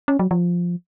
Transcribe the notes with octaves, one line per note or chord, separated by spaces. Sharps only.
C#4
F#3
F3